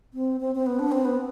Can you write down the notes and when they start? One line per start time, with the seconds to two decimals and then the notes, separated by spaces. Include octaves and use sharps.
0.14 C4
0.40 C4
0.55 C4
0.66 B3
0.79 D4
0.92 C4
1.05 B3